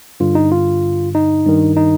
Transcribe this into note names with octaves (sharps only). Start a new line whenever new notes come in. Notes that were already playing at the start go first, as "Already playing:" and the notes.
G2 D3 F4
D#4
F4
D#4
G2 D#3
D#4